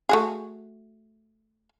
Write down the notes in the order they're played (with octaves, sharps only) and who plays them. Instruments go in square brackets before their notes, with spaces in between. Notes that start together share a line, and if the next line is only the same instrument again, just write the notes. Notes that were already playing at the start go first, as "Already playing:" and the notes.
[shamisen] A3 F#4 G#4